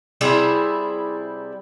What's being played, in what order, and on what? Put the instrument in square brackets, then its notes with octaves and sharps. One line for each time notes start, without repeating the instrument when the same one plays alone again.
[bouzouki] C3 G3 E4 G#4